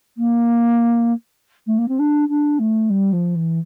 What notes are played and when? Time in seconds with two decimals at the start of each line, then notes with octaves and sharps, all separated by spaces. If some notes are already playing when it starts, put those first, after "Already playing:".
0.17 A#3
1.67 A3
1.78 A#3
1.88 C4
1.99 D4
2.29 D4
2.59 A3
2.90 G3
3.13 F3
3.35 E3